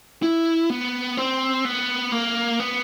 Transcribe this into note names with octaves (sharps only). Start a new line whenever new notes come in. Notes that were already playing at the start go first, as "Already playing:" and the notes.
E4
B3
C4
B3
A#3
B3